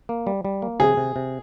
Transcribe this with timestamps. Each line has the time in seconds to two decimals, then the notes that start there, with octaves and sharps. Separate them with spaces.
0.09 A#3
0.27 G3
0.44 G3
0.62 A#3
0.80 C3 G#4
0.97 C3
1.16 C3